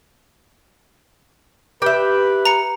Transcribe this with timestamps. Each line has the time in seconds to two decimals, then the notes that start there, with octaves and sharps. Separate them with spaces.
1.82 G4 B4 E5
2.45 A#5 C#7